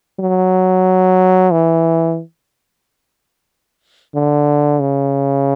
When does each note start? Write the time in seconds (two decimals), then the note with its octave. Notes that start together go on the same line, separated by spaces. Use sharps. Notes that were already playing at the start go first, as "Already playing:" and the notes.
0.20 F#3
1.51 E3
4.15 D3
4.81 C#3